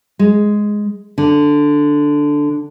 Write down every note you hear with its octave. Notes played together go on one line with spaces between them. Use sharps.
G#3
D3